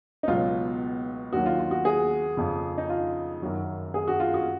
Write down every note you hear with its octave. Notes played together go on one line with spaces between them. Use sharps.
D#4
C#2 B2 F#3 F4
D#2 D#3 F#3 F#4
F4
F4
F#4
G#4
F2 C#3 F3
D#4
F4
F#2 D#3 F#3
G#4
F#4
F4
F#4